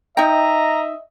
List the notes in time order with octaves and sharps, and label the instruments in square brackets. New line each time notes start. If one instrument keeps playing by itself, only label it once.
[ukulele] D#4 G5 [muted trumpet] D#5 [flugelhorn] E5 [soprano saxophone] A#5